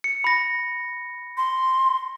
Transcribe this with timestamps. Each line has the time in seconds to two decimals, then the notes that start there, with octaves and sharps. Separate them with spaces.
0.04 C#7
0.24 B5 A#6
1.37 C6